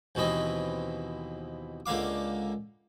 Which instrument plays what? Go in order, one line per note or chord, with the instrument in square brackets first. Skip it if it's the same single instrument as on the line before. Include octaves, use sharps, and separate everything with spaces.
[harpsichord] D#2 B2 E3 C4 D#5
C#2 D3 A#3 F5 D6